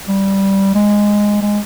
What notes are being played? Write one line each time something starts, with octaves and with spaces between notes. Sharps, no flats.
G3
G#3
G#3